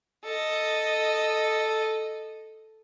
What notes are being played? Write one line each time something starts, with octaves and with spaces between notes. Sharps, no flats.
A4 D#5